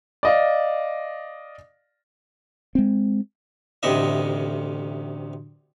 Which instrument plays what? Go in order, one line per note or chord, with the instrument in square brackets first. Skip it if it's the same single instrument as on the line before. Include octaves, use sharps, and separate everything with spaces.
[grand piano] D5 D#5 F5
[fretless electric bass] G#3 C4
[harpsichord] A1 D2 C3 D#3 D#5 E5